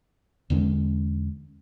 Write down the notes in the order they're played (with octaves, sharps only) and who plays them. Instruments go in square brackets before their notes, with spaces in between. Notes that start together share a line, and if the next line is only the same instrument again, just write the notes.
[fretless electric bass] E2 D3 G#3 C#4